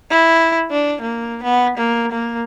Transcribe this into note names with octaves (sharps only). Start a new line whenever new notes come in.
E4
D4
A#3
B3
A#3
A#3